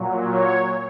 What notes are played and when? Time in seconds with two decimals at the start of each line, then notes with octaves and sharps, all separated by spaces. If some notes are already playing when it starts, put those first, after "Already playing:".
Already playing: A#2 F#3
0.28 C#5